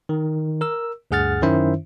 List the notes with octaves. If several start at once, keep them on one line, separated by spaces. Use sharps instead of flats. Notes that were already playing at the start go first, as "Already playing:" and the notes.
D#3
A#4 E6
D2 G2 G#4 F#5 F6 A6
F#2 D#3 C#4 E4 C5 E5